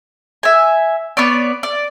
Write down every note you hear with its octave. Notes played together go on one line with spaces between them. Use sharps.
E5 G#5
B3 C#5 D5
D5